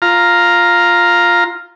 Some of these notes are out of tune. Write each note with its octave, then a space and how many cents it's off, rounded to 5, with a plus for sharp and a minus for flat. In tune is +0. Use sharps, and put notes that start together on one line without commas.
F4 +0 A#5 +0